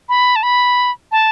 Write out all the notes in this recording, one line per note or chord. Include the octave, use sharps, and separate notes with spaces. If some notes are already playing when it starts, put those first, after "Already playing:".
B5
A5
B5
A5